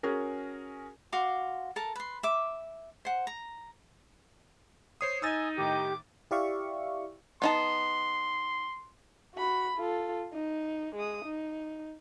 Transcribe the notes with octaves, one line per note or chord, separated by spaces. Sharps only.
C#4 F#4 G#4 A#4
F#4 F5 C6 D6
A4 A#4 A5
B4 C6
E5 D6
C5 F#5
A#5
C5 C#5 D#6 C7
D#4 G#5 D#6 E6 A6
A2 D#3 G4 D6
E4 G4 D5 E5 F5 C#6
B3 D#4 A5 C6
F#4 B5
F4 A4
D#4
G#3 D#6
D#4